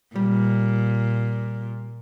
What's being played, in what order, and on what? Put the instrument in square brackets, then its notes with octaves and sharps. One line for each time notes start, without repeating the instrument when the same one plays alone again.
[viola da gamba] A#2 [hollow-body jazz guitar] G3